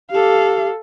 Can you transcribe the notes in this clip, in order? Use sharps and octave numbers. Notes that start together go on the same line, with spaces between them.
G4 A4 F5